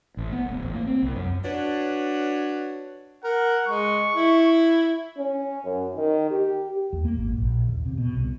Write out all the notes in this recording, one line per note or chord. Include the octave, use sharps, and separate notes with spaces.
A1
B3
D1
A1
A#3
C4
C2
F#2
D4 F#4 B4 C#5
A#4 F#5
G#3 C#6
E4
C#4
F#2
D#3
G4
D#2
A#3
G#1
A#1
D#2
C3
B2
C2